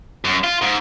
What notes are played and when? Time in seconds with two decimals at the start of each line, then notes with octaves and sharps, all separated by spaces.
0.25 F#2
0.44 F4
0.62 G#2